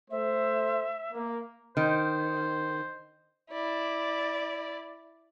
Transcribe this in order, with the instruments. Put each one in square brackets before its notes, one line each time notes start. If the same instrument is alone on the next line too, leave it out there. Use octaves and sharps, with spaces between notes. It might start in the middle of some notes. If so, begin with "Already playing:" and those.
[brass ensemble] A3 C5 [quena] E5
[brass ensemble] A#3
[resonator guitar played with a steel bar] D#3 [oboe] C5
[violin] E4 D5